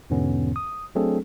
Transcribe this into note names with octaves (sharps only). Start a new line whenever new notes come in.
E2 G#2 B2 D3 B3 C#4
D#6
F#3 A3 C4 D4 G#4 A4